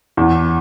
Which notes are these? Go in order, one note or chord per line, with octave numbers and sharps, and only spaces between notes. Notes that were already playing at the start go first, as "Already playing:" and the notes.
E2